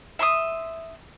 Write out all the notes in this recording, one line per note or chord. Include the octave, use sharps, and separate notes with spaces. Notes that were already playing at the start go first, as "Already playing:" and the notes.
E5 C6 C#6 D#6